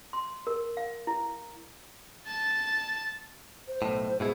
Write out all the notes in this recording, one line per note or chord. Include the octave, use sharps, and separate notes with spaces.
C6
A#4
F5
E4
A5 A6
C5
B1 A2
G#2 B2 E4 G#4